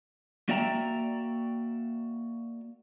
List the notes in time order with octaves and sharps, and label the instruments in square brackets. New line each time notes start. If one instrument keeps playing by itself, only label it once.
[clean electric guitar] A#3 F#4 D5 E5 G5 A#5